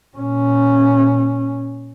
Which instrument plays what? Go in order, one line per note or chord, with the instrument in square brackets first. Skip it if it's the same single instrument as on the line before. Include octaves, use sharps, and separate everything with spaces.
[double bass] A#2 C#4